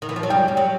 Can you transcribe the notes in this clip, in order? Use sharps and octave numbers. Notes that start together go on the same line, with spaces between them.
D#3
E3
F3
F#3
G3 G5
G3
F#3